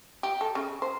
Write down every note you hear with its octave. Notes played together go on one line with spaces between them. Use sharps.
G4
A4
C#3
C5